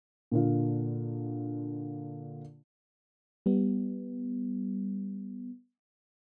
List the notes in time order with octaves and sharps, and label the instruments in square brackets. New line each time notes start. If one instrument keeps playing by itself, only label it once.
[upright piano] A#2 D3 F4
[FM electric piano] G3 B3